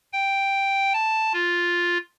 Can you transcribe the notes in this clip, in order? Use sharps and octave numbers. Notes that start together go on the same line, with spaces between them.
G5
A5
F4